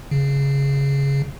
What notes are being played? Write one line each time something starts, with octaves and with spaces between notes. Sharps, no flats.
C#3